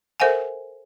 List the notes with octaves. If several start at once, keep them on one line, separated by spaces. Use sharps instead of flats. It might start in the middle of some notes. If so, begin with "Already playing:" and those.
A4 A#4 C5 E5 F#5 G#5